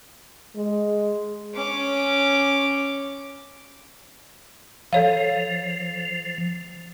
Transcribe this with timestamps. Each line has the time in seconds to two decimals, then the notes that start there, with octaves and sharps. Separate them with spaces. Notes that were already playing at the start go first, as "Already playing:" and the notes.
0.56 G#3
1.54 C#4 D6
4.93 F3 A4 C#5 F5